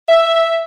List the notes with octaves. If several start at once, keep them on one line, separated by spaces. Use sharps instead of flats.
E5